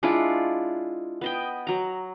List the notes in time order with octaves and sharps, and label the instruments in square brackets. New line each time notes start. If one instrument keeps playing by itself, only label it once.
[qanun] G#3 D4 E4 F4
B3 D#5 G5
F#3 A#5